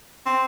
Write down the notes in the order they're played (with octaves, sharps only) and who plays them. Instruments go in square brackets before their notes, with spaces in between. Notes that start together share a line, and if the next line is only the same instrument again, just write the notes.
[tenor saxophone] C4